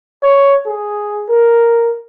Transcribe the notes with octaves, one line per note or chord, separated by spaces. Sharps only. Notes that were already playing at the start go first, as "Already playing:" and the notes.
C#5
G#4
A#4